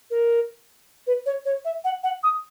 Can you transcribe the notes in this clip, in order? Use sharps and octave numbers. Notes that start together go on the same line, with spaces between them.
A#4
B4
C#5
C#5
E5
F#5
F#5
D#6